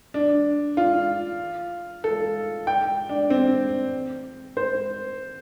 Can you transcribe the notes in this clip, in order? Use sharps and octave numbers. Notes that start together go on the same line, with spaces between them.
D4
F4
A4
G5
D4
C4
C5